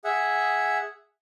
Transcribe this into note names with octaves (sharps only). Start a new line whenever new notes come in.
G#4 E5 F#5